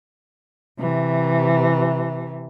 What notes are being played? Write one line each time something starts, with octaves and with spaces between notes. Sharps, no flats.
C3 E3